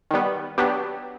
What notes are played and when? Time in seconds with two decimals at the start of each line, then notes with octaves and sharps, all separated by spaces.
0.11 D#3 G3 B3
0.58 F#3 B3 D4 G4